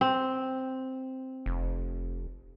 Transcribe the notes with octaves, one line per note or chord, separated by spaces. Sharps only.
C4
F1